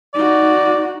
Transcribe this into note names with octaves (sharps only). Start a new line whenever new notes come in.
D#4 F#4 D5